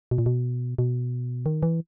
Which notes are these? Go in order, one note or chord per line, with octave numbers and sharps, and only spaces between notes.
B2
A#2
B2
B2
D#3
E3